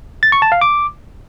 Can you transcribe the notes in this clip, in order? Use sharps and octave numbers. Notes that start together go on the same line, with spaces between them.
A6
C#6
A5
F5
D6